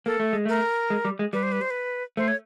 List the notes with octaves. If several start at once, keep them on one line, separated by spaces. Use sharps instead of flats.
A#3 A4
A3
G#3
A3 A#4
G#3
G3
G#3
G3 B4
C5
B4
C5
B4
A3 C5
C#5